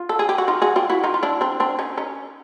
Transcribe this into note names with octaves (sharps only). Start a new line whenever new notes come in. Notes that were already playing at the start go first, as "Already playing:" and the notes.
Already playing: F4
A4
G#4
G4
F#4
D#4 F4
F#4 G#4
F4 G4
E4 F#4
D#4 F4
F4
D4 E4
C4 D4
C4 D4
C#4 D#4
C#4 D#4